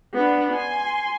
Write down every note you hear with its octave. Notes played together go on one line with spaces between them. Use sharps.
B3 D4
G#5 C6